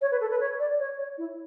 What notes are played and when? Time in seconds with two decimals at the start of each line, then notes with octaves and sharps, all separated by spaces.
0.01 C#5
0.11 B4
0.21 A4
0.31 B4
0.40 C#5
0.60 D5
0.79 C#5
0.98 C#5
1.18 E4